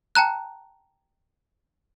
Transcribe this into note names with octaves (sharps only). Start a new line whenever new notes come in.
G5 A5 A#5 F#6